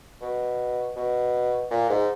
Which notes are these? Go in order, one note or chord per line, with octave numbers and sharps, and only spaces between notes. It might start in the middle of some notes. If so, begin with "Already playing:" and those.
B2
B2
A#2
G#2